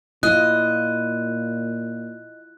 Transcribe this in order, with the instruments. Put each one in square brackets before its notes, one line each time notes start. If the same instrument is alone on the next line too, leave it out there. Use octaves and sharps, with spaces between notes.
[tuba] A#2 [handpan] E4 F4 [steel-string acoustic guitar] D#5 [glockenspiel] F#6